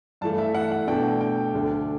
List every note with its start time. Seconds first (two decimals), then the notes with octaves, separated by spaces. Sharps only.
0.21 G2 E3 A3 A5
0.38 E5
0.55 F#5
0.71 F#5
0.87 B2 A3 D4 G5
1.21 G5
1.54 D2 D3 A3 D4